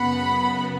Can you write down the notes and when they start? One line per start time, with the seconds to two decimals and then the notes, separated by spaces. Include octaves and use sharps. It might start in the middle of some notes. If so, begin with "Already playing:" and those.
Already playing: F#2 C#3 B3 F#5 B5